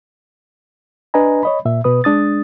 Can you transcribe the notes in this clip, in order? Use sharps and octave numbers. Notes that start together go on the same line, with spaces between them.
D4 B4 D#5 G#5 A#5
C#5 D#5 B5
A#2 E5
B2 B4 D#6
G#3 D4 D#6 A6